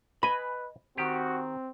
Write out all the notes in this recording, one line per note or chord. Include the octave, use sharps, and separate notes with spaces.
B4 D#5 G#5 B5
D#3 C4 F#4 G4